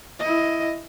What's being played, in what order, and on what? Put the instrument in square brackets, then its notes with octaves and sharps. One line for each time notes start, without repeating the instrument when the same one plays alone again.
[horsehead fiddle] E4 D#5